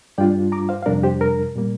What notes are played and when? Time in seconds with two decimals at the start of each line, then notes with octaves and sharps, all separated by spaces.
0.18 G2 G3 D4 F4 D5 G5
0.52 A#5 D6
0.69 C5 F5
0.82 F5
0.86 F2 C3 G3 D4 A#4 D5
1.03 G4 C5
1.21 A#4
1.56 A#2 G3 A#3